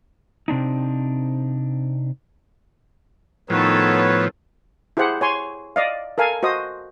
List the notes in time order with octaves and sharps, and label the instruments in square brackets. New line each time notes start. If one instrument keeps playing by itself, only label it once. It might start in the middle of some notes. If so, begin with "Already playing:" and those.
[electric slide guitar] C3 C4 D4 D#4
[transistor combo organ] A2 F3 [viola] D#3 A4 [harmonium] B3 B4 C#5
[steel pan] E4 G4 G#4 C5 F#5
C#5 G#5 C6
D5 D#5 F5
A4 A#4 F5 G#5
F#4 C5 D#5 D#6